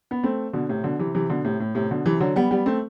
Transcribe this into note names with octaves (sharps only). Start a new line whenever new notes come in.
B3
A3 C4
B2 D3
A2 C3
B2 D3
C3 E3
C3 E3
B2 D3
A2 C3
A2
A2 C3
B2 D3
C3 E3
D3 F#3
G3 B3
G3 B3
A3 C4